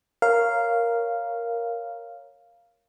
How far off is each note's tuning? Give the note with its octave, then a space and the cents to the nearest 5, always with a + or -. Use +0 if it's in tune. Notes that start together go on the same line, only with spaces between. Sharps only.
A#4 +0 C#5 +0 F5 -5